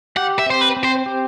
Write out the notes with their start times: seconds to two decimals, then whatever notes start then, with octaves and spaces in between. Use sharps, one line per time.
0.17 G4 F#5
0.39 E5
0.46 C4 C5
0.61 B4
0.77 C4
0.84 C5
1.06 G4